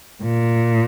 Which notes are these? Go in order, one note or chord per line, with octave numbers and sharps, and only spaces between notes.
A#2